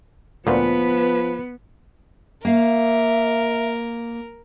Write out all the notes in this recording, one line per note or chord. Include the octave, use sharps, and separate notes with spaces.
D2 A#2 F3 B3 B4
A#3 A#4 E5 F5